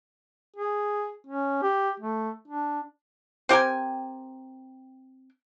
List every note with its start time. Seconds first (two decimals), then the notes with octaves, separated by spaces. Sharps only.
0.56 G#4
1.27 C#4
1.63 G4
2.00 A3
2.48 D4
3.49 C4 G4 A#4 G#5